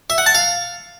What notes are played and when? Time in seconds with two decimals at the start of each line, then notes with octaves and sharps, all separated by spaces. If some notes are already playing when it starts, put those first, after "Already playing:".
0.10 E5
0.18 F#5
0.26 A5
0.35 F5